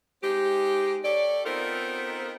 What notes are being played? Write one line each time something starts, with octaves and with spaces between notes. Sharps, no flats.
G#3 C4 D#4 G4
G4 A4 C#5 D5
B3 C4 D#4 F4 A4 A#4